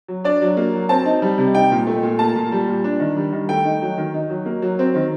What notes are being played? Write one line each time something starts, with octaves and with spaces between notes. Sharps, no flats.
F#3
D4 D5
F#3
A#3
F#3
C4 A5
D#4
G3
C3
D#4 G5
A#2
A3
A#2
A#3 A5
A#2
G3
A#2
D4
D#3
G3
D#3
A3 G5
D#4
F#3
D#3
D#4
F#3
A#3
F#3
C4
D#3